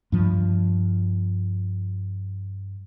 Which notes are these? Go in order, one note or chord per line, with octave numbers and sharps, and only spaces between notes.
G2 F3 G3